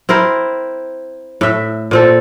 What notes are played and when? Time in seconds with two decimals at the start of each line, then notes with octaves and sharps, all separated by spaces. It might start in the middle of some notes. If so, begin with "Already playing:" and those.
0.09 C4 E4 A#4 C5
1.41 A2 E5
1.91 A#2 C4 A4